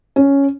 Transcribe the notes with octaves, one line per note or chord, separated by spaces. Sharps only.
C#4